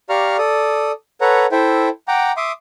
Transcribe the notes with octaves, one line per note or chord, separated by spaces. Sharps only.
G4 D5 F5 A#5 C#6 F6
A4 D5 D#6
A4 B4 C#5 F#5 A#5
E4 A4 C5 E5 G5
F#5 G5 A#5 D6
E5 C6 D6 D#6